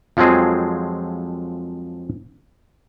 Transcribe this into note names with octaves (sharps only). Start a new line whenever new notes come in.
F2 F3 F#3 G#3 C4 G#4